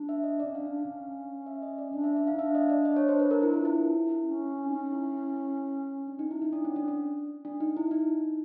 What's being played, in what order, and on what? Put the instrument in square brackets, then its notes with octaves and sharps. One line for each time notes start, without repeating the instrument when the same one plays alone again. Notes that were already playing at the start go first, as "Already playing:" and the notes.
Already playing: [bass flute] D4
[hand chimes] E5
D#5
D5
[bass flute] C#4
[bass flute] D4 [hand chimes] F5
[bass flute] D4
C#4
[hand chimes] E5
D#5
D5
[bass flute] D4 [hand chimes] D5
[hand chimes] E5
E5
F5
[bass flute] D#4
[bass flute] D4 [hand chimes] E5
[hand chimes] D#5
D5
D#5
C#5
C5
B4
A#4
E4
F4
E4
[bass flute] C#4
[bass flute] C#4 [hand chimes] D#4
[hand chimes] E4
D4
D#4
E4
D#4
D4
C#4
D4
D4
D4
D#4
E4
D#4